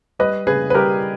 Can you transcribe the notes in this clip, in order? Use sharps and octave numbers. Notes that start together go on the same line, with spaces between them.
G3 B4 D#5
C#3 G#4 B4
B4
G3 G4 A#4